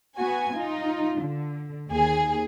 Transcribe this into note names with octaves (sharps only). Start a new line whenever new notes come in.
B3 F#4 G#5
D#4 F4
D3
D#2 G#4